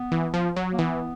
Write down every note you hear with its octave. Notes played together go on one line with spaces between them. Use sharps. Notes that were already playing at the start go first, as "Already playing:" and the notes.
Already playing: B3
E3
F3
F#3
A#3
E3 B3